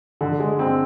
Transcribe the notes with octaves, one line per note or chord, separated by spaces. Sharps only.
D3
G#3
C4